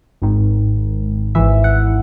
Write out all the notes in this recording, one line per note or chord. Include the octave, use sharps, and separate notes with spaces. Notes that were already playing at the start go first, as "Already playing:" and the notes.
G#1 G#2 D#3
G#1 G#2 E3 E5
F#5